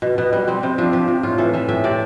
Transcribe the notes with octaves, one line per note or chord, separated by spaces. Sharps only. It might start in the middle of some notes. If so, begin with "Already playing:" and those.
B2
B2 B3
G3 B3
G3 C4
C3 C4
F3 D4
F3 G4
C3
A2 F4
E3 A4
E3 E5
A2 E5
C3 D5